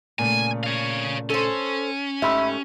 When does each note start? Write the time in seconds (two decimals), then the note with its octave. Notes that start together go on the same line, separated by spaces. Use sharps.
0.19 A#2 C#3 A3 G#5
0.64 C#5 F5
1.30 C#4 A4 C5
2.22 G#2 A3 G4 E5 B5